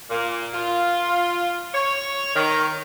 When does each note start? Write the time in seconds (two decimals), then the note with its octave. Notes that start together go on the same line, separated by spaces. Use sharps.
0.10 A#2
0.54 F4
1.74 C#5
2.35 D#3